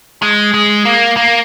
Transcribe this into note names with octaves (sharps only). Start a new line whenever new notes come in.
G#3
G#3
A#3
A#3